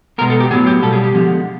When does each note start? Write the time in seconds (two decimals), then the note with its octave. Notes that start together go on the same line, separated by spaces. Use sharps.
0.18 B2 G#3 B3 A#4
0.30 A4
0.40 G4
0.51 A2 F#3 B3 G#4
0.67 G4
0.82 B2 G3 A#3 A4
0.93 G#4
1.04 G4
1.14 D3 F3 G#3 B3